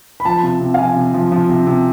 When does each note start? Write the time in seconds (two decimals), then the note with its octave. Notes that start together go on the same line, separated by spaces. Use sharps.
0.20 B5
0.25 F3 A5
0.43 C3
0.60 C3
0.74 F5
0.78 F3 G#5
0.96 C3
1.14 F3
1.32 F3
1.49 C3
1.67 C3